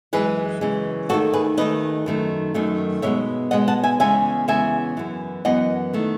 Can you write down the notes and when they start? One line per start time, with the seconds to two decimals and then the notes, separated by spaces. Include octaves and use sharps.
0.13 F#2 C#3 E3 G#3 G#4 B4
0.61 F#2 C#3 E3 G#3
1.09 D#2 D#3 A3 F#4 A4
1.33 G#4 B4
1.57 D#2 D#3 A3 B4 D#5
2.06 F#2 D#3 A3
2.54 F#2 D#3 A3
3.02 B2 G#3 B3 C#5 E5
3.51 B2 G#3 B3 D#5 F#5
3.68 F#5 A5
3.83 E5 G#5
4.00 E2 C#3 G#3 B3 E5 G#5
4.48 E2 C#3 G#3 B3 E5 G#5
4.97 F#2 E3 B3
5.45 F#2 E3 B3 D#5 F#5
5.93 D#3 A3